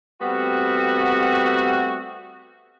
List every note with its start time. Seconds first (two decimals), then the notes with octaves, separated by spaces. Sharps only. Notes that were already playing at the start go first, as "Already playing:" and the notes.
0.22 G3 A3 B3 C4 F#4